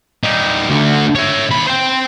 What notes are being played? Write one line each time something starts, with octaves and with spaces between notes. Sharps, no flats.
G3 D#4
D2 D3
C#5 E5
D#2 B5
C5 G5